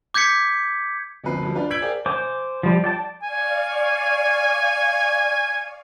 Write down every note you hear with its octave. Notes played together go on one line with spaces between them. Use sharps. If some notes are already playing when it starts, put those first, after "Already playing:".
D6 G6 G#6 B6 C#7
F#1 D2 F3 C4 B4 C7
D2 F3 G3
D4 F4 B4 D5 F5
E6 G6 G#6 B6 D7 F#7
G#4 A#4 C5 D5 F5 G5
C5 G#5 D6
F3 G3
D5 G5 A5
D5 F5 G#5 C#6